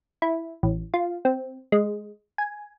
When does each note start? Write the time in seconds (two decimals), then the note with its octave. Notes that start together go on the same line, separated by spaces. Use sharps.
0.22 E4
0.63 A1
0.94 F4
1.25 C4
1.72 G#3
2.38 G#5